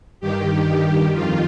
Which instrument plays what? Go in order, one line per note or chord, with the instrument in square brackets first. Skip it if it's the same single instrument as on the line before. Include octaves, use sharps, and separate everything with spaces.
[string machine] G2 D#3 G4
F2 D#3 F4